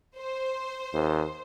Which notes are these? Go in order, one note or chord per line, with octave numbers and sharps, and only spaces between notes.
C5
D#2